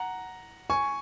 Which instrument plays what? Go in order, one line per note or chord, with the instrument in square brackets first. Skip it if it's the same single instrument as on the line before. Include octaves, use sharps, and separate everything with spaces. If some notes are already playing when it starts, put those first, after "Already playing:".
Already playing: [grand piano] F#5 A#5
G#5 C#6